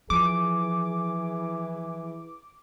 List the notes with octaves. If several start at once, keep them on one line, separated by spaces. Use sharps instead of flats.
E3 F3 G#4 D6